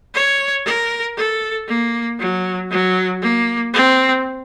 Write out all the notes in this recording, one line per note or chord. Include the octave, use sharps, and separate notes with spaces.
C#5
A#4
A4
A#3
F#3
F#3
A#3
C4